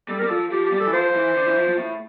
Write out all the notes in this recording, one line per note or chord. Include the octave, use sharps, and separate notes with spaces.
G3 A4
G3 A#4
F3 A4
F3 G4
G4
G3
A4
E3
F3 C5
E3
D3
E3
F3
F3
A2